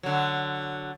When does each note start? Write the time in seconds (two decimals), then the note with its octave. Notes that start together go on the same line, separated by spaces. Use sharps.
0.03 D3 F#3